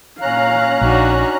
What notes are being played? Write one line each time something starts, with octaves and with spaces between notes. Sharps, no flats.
A#2 C#4 F5 A#5 F#6
A#1 D4 D#4 F#4